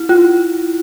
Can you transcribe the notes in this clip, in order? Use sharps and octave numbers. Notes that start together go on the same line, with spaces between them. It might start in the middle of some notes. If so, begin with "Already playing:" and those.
Already playing: E4
F4